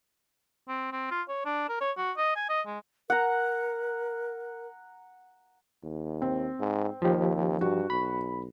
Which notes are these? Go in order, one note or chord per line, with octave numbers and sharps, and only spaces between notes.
C4
C4
F4
C#5
D4
A#4
C#5
F#4
D#5
G#5
D#5
G#3
A#4 F#5 A#5
D#2
C4
G#2
D#2 F3 G4
G2 F#4
B1 B5